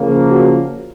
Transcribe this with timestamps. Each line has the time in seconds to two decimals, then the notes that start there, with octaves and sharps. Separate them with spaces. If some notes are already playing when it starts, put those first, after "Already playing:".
Already playing: C#3 F3 A#3
0.31 F#4